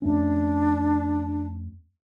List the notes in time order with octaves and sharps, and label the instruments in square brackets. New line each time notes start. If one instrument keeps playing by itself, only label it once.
[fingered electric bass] F2 A3 C#4 [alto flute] D4